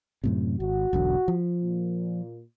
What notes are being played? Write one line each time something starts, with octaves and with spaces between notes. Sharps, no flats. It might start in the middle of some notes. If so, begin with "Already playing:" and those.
F#2 A2 C3
G#1 F#4
E1 B1 D3
F3
A#2